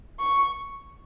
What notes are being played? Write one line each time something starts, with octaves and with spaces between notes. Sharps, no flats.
C#6